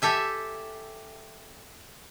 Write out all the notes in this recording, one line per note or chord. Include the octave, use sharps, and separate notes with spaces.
G4 A4 E5 G#5